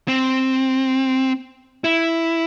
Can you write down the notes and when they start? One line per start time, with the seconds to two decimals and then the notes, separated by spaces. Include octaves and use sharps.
0.08 C4
1.84 E4